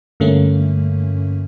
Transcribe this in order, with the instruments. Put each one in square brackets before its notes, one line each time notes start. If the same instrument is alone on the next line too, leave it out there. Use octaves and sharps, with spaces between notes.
[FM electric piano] G2 D3 A3 A#3 C#4